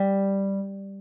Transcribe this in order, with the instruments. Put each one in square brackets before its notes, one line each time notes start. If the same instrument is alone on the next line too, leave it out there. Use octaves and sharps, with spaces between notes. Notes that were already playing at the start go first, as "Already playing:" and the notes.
Already playing: [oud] G3